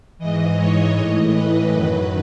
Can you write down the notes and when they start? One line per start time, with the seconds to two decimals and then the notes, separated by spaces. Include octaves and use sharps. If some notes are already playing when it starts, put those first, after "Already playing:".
0.18 G#2 E3 D#5
0.57 C#5
0.94 A2 E3 D#5
1.33 B4
1.71 F#2 D#3 F#3 B4